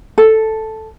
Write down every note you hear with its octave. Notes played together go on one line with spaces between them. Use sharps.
A4